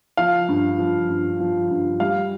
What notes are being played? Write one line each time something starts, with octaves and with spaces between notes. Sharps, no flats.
F3 F5
G2
F3
G2
F3
G2
G3 F5